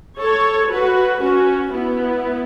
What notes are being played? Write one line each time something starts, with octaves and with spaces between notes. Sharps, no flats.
A4 C#5
F#4 B4
C#4 F#4
B3 E4